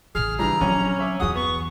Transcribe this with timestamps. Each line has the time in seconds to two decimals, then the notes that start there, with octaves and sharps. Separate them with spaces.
0.15 A1 C#3 G#4 F6
0.39 E3 G3 D4 A#5
0.61 A#1 F#3 C4 C#4
0.99 C#5 E5 D6
1.20 E2 E3 F#4 G#4 F#5 D#6
1.35 B3 C#6